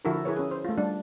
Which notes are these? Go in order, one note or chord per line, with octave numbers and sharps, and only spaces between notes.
D3 F3 E4 F#4 A4 A#4
E4 G#4 A#4 B4 C#5
C#4 G#4
C5
A3 F4
G3 D4